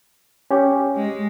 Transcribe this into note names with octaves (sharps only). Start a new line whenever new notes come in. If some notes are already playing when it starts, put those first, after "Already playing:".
C#4 G4
G#3